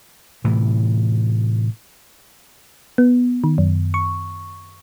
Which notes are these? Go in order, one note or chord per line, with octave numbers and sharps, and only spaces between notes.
A2 C3 E3
B3
D#3
F#2
C#6